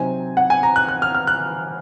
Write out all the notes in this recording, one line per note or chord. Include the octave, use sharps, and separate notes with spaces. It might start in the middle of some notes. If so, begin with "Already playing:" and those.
Already playing: C3 F#3 C4 D#4 G#5
F#5
G#5
A#5
F#6
F#6
F6
F6
F#6